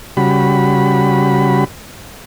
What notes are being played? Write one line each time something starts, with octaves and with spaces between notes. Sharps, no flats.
C#3 G3 F#4 B5